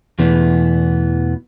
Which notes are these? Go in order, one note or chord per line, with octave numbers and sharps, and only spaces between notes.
E2 B2 E3 A3 B3